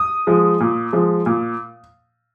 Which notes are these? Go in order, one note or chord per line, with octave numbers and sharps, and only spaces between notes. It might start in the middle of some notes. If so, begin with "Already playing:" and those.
Already playing: D#6
F3 G#3
A#2
F3 G#3
A#2